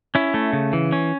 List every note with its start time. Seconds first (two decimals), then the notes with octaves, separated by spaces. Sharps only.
0.15 C#4 E4
0.34 A3
0.53 C#3
0.73 E3
0.92 C#4